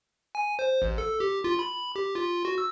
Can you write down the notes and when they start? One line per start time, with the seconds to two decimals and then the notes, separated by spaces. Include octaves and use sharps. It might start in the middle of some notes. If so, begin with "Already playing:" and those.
0.35 G#5
0.59 C5
0.82 A1
0.98 A4
1.20 G4
1.44 F4
1.59 B5
1.96 G4
2.15 F4
2.45 F#4
2.58 E6